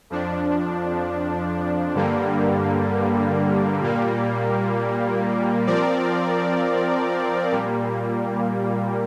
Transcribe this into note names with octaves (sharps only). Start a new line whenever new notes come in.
F2 F3 D4
G2 D3 G3 A#3
A#2 G3 A#3
F3 C4 A#4 D5
A#2 G3 A#3